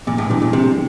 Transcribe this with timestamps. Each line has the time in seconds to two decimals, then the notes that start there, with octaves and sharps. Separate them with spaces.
0.07 E2 A#2
0.18 A2
0.29 A#2 E3 G3 D4
0.42 A#2
0.53 E2 C3